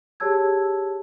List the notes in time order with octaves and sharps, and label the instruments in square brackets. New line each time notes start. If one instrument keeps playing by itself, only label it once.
[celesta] G4 G#4 C#5 A5 E6 G#6